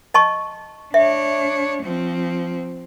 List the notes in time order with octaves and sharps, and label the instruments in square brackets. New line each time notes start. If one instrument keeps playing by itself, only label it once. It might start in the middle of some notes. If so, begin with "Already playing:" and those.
[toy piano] D#5 A5 C#6
[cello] D4 C#5 [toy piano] E5
[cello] F3 C4